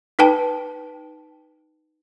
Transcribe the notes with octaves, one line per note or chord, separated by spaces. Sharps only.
D#4 B4 G5 A5